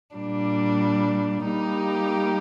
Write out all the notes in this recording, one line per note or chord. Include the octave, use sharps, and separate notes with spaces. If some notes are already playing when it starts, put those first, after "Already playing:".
A#2 G3 D4
G3 A#3 D#4 G4